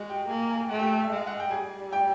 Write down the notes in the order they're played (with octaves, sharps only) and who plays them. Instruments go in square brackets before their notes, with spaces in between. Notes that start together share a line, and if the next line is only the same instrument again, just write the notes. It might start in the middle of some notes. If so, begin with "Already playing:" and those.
Already playing: [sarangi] G#3 [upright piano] F#4 F#5
[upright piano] G4 G5
[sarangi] A#3 [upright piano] G#4 G#5
[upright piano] G#5
G5
[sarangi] A3 [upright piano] F#5
[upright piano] G4 G5
E5
[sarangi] G#3
[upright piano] F5
F#5
G5
[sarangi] G3 [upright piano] G#4 G#5
[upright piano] G4 G5